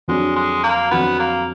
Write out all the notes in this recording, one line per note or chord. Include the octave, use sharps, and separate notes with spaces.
F2 D3 F#3 G#3 D4 F#4
G#3
A#3
F2 D3 F#3 B3 D4 F#4
A#3